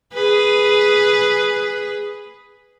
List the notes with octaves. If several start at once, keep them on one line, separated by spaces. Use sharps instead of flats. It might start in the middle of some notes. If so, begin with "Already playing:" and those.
G#4 B4